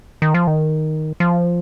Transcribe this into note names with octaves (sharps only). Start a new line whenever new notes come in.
D#3
F3
D#3
F3